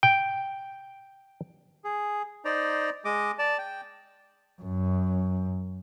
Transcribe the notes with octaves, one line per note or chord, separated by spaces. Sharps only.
G5
G#4
D#4 C5 D5 A#5
G#3 D#5 D6
D5 A5
G5
F#2